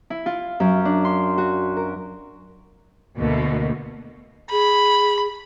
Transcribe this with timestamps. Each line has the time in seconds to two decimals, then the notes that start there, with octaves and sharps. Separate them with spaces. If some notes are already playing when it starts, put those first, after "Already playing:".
0.10 E4
0.26 F4
0.60 F#2
0.85 D4
1.05 C6
1.38 F#4
1.77 A#4
3.17 D2 B2 D3 A3 A#3
4.52 G#4 B5